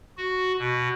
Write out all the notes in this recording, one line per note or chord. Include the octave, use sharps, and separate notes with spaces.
F#4
B2